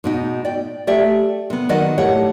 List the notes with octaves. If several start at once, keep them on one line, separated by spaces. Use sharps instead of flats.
G#2 B2 D#4
D5 G5
A3 G4 D5 E5
C3 B3
D#3 F#3 B4 D5 D#5 F#5
A2 G4 C#5 F#5